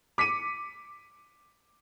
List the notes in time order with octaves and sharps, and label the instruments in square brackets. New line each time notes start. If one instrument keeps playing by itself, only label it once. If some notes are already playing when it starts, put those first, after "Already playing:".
[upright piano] D6 B6 C#7 D#7